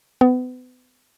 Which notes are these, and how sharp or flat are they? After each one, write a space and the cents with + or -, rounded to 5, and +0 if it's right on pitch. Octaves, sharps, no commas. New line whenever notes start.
B3 +35